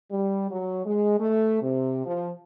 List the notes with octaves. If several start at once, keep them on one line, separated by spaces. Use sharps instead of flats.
G3
F#3
G#3
A3
C3
F3